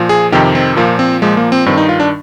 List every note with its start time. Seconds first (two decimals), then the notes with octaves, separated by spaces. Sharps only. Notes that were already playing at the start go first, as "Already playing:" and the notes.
Already playing: A#2 F3
0.09 G#4
0.32 F2 C3 D#3 G4
0.55 C4
0.77 A#2 F3 A#3
0.99 C4
1.22 A#2 F3 G#3
1.37 A#3
1.52 C4
1.66 G2 D#3 C4
1.77 D#4
1.89 F4
2.00 D4